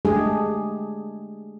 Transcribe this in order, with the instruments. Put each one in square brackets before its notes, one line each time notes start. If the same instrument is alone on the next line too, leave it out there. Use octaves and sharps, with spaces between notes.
[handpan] G#3 A3 D4 G4 G#4